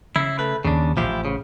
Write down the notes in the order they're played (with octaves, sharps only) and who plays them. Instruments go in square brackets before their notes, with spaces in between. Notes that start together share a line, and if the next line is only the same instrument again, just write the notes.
[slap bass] C#3 [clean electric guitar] E4
[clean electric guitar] A3 B4
[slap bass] D#2 [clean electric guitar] C#3 D4
[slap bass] A1 [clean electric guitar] F3 E4 G4
[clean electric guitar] C#3